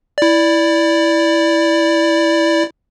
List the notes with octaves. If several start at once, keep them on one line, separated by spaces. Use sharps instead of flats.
E4 D5